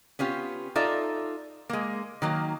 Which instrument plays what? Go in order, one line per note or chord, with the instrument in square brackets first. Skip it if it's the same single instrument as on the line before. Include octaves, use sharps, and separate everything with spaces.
[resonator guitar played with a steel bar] B3 C#4 F4 G4
D#4 F4 A4 D5 E5
G#3 A#3
D#3 F#3 A#3